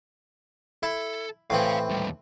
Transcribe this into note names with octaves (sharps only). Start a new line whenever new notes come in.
E4 A4
A2 E3 C4 C#5 F5
D#2 G3